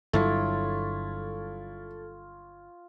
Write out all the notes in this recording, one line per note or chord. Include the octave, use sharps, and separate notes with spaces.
G1 G2 F#3 E4 F4 A4 C#5